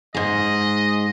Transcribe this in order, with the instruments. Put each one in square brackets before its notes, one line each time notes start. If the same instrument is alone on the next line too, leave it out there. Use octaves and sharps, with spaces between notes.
[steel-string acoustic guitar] G#2 G#4 [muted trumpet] D#5